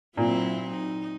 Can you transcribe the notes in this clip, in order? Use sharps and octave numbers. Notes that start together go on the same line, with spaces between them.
A#2 F#3 C4 E4
D#4